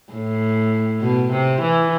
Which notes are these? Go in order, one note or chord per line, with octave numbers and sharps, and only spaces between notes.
A2
B2
C3
E3